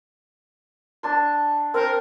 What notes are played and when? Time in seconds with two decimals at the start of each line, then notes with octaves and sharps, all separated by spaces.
1.03 D4 A5 C6
1.74 C4 A#4 C5